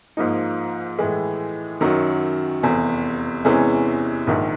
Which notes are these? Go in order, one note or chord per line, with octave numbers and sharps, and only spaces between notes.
G#2 F3 A#3 D#4
A2 E3 G#3
F#2 D#3 F#3
F1 E2 C3
E2 C3 E3 G#3 C#4
A#1 G#2 D#3